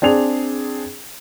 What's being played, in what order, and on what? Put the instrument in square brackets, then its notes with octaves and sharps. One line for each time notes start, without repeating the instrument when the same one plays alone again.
[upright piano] C4 D4 G#4 F7